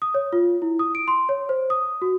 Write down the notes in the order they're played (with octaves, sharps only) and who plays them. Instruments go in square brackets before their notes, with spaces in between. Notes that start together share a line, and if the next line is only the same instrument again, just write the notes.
[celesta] D#6
C#5
F4
E4
D#6
D7
C6
C#5
C5
D#6
F#4